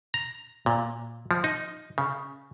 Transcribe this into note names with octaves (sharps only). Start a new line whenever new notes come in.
A#5
A#2
F3
D#4
C#3